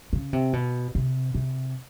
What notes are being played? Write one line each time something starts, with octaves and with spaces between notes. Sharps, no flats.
C#3
C3
B2
C3
C3